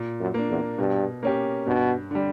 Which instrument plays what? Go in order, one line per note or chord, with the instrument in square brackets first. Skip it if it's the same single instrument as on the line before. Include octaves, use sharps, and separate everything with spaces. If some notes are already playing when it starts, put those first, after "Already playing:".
Already playing: [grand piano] A#2
[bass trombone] F#2
[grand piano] A#3 D4
[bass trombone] E2
[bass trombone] G2 [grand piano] B2
[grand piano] A#3 C#4 G4
[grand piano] G2 [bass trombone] B2
[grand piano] D3 G3